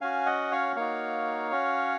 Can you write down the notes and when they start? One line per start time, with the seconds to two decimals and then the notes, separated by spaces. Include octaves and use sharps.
0.01 C#4 F#4 F5 G#5
0.26 D#5 F#5
0.51 C#5 F5
0.76 A#3 D#4 F#4 C#5 F5
1.51 C#4 F#4